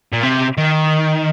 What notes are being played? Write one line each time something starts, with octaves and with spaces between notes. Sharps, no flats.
A#2
C3
D#3